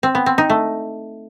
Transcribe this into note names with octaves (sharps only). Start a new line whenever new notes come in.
C4
B3
C4
D#4
A3